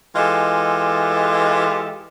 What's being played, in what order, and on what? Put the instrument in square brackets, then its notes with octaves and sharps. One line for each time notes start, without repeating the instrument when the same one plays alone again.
[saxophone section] E3 G#3 F4 G4 A4 D#5